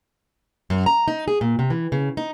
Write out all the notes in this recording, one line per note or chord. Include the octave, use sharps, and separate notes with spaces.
F#2
A#5
D#4
G#4
A#2
C3
E3
C#3
D#4